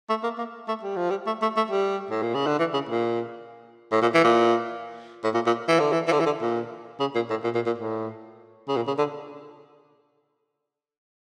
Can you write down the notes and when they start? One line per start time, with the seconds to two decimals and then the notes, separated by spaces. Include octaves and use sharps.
0.09 A3
0.23 A#3
0.38 A#3
0.68 A3
0.83 G3
0.96 F3
1.10 G3
1.27 A3
1.42 A3
1.56 A3
1.70 G3
2.10 A2
2.22 A#2
2.35 C#3
2.46 D3
2.59 E3
2.73 C#3
2.89 A#2
3.92 A2
4.02 A#2
4.14 E3
4.24 A#2
5.24 A2
5.34 A#2
5.46 A#2
5.68 E3
5.79 D3
5.92 E3
6.07 E3
6.12 D3
6.20 E3
6.26 D3
6.41 A#2
7.00 C#3
7.15 A#2
7.30 A2
7.44 A#2
7.55 A#2
7.66 A#2
7.78 A2
8.68 C#3
8.76 A#2
8.87 C#3
8.98 D3